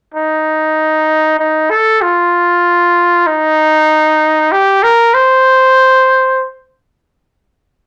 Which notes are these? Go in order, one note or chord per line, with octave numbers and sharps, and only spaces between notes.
D#4
D#4
A4
F4
D#4
G4
A#4
C5